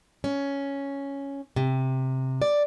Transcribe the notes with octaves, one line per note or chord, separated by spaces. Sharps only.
C#4
C3
D5